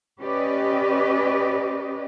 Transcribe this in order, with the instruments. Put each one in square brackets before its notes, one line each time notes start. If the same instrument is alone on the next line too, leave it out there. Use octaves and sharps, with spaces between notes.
[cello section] C#4 G4 B4 D5 D#5